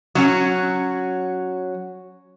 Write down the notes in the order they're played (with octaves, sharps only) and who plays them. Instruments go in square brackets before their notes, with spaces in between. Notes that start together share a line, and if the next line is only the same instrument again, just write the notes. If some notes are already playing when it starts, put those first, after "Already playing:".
[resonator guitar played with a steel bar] F#3 C#4 F#4